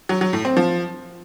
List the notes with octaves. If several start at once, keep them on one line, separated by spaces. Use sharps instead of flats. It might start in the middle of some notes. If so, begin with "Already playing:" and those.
F#3
F#3
A2
C4
F3